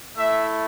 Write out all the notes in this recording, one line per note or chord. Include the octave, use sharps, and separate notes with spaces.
A3 E4 E5